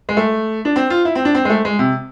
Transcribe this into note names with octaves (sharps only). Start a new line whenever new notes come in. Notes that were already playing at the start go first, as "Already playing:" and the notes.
G#3
A3
D4
C4
F4
E4
C4
D4
C4
G#3
A3
G#3
C3